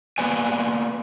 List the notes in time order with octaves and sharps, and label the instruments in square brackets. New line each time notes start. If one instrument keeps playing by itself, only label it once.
[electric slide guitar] A#3 B3 B4 D5 G#5